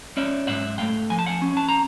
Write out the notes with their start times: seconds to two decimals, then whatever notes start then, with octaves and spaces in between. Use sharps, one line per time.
0.17 C#4 D5 E5
0.47 G#2 E5 F#5
0.78 A3 F5 G5
1.10 F3 G#5
1.19 A5
1.27 F#5 G#5
1.42 C#4
1.57 A5
1.69 A#5